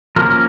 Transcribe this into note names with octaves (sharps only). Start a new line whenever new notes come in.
F3 A#3 C#4 A#4